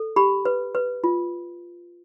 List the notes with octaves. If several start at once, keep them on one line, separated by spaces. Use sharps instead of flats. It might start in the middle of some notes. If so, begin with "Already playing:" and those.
Already playing: A4
G4 B5
B4
B4
F4